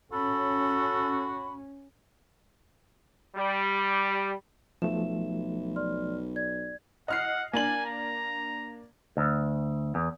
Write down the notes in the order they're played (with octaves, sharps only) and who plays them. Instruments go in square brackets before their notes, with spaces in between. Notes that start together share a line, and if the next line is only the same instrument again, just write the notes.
[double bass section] C#4 [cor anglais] F#4 [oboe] A4 [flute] B5
[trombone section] G3
[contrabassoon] B1 [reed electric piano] F3 A3 [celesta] E5 E7
[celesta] D5 C6 F6
D5 G#6
[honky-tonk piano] D#5 F6 C7 [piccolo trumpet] F#5
[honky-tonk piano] A#3 D4 F#7 [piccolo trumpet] G#5
[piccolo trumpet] A#5
[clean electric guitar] D2
E2